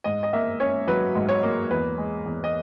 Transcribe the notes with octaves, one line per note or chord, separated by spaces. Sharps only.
G#2 D#5
D#5
A#3 E5
C#4 C#5
F#3 B4
G#2
C#5
A#3
E2 B4
G#3
E2
D#5